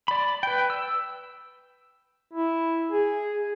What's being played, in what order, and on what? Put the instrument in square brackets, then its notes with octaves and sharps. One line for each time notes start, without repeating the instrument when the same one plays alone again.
[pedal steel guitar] D5 B5
B4 G5
E6
[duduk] E4
G#4